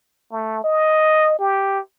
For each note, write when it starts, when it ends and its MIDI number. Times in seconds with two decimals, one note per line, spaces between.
0.32 0.62 57
0.64 1.38 75
1.39 1.79 67